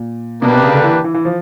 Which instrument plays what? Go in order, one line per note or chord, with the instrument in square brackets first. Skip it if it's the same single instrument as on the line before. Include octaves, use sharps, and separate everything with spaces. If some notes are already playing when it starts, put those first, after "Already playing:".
Already playing: [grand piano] A#2
[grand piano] B2 [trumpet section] A#3 D4 G4 B4
[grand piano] C3
C#3
D3
E3
E3
E3
F3